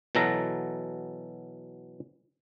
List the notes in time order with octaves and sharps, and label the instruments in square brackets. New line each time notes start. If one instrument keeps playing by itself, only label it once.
[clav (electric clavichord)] B2 E3 F#3 A4 A#5